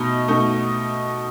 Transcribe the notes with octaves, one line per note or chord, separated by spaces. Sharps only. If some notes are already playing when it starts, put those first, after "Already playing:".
Already playing: B2 A3 D#4
B2 A3 D#4